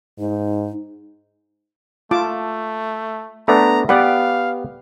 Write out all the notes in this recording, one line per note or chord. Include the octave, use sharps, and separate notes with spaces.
G#2 D#4
A3 F4 A5 D6
A3 B3 D4 A#5
B3 G4 B4 D5 F5 F#5